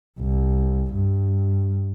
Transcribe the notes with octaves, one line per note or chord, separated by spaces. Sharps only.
C2
G2